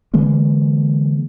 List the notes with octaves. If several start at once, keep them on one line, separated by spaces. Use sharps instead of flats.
D3 E3 G#3 A#3